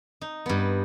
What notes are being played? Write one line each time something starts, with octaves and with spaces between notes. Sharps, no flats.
D#4
G2 B3